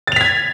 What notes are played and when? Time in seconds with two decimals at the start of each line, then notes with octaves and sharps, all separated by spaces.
0.07 A6
0.12 F7
0.16 B6
0.21 G#6